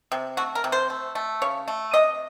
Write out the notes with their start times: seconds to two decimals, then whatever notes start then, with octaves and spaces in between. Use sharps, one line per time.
0.12 C3
0.37 A3 F#4
0.55 A#4
0.64 C3
0.72 C5
0.90 A3
1.15 A3
1.42 C#3 C#5
1.68 A3
1.94 C3 D#5